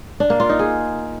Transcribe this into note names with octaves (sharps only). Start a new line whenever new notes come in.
D4
A#3
F4
D#4
G#4